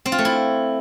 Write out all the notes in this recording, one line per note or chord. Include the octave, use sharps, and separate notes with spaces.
C4
F4
A3
E4